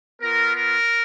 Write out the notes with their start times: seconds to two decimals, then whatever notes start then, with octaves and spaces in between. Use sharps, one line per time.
0.21 B3 F4 A#4
0.55 A#4